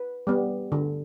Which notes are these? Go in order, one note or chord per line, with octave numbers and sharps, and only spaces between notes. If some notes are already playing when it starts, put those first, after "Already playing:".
Already playing: B4
G3 B3
D3